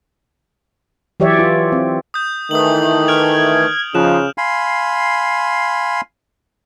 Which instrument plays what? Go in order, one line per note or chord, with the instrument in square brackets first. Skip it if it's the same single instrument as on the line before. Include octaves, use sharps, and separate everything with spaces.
[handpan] E3 F#3 G4 C#5 D5 E5
F4
C4
[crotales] D#6 G6
[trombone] D#3 [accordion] E3 A3 [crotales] D#6 F#7
[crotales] F6 D7 F7 [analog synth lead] G#6
[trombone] C#3 [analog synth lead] F3 [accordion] D#4 [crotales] F#6 E7
[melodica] F5 G#5 B5 C6